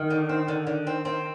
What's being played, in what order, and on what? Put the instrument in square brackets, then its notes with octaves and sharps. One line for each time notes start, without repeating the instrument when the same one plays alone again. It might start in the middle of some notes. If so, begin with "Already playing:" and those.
Already playing: [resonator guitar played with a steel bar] D#3
[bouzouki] D3
C4
D3
D3
C4
C4